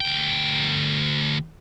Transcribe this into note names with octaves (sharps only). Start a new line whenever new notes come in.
D2 G5